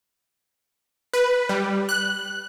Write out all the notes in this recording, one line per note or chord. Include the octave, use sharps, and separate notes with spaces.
B4
G3
F#6